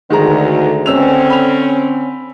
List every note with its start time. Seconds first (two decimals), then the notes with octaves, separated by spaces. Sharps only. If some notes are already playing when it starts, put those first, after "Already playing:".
0.10 D2 D#3 G#3 A#5
0.86 C#2 D3 C4 C#4 E6 F7
1.30 B5 F7